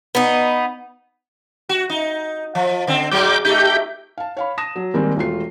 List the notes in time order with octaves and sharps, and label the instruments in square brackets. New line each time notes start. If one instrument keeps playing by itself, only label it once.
[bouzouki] B3 D#4
[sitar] F#4
D#4
F3
D3 C4
[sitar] G#2 F#3 G#3 [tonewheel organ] D6 G6
[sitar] A3 D#4 [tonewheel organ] G4 G6
[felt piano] F5 A5
C#5 F5 B5
A5 D#6 A#6 E7
F#3
D#3 G3 G#3 A#3 C4
E1 A3 F4 C7